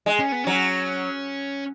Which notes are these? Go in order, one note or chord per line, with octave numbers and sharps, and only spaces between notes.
G#3
C#4
B3
F#3 C#4